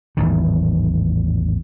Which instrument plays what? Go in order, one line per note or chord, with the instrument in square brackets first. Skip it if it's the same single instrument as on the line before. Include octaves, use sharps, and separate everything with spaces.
[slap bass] A1 E2 G#2 D#3